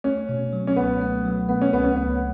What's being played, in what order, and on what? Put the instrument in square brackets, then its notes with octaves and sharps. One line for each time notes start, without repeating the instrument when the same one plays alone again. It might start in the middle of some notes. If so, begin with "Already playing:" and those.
[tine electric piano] A3 [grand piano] C#4
[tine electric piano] B2
F#3
[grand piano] C#4
[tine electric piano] C#2 [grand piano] B3
[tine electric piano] A3
F#3
[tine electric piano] A3 [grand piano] B3
[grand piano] C#4
[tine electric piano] C#2 [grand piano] B3
[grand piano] C#4
[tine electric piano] C#2 [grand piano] B3